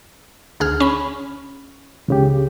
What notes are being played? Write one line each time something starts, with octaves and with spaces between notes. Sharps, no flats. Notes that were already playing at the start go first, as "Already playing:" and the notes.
D2 G#4 F6
C#4 B5
C#2 C#3 G4